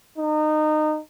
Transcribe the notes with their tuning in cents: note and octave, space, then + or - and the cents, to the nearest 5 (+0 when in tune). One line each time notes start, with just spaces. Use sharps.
D#4 -25